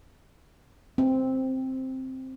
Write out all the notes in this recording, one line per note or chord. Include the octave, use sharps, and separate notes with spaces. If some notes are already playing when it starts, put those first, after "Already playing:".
C4